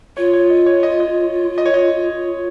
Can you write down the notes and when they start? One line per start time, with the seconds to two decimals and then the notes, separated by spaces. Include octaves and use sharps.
0.17 F4 C#5
0.33 C#5
0.50 D#5
0.66 C#5
0.83 D#5
1.00 D#5
1.58 D#5
1.65 C#5
1.74 D#5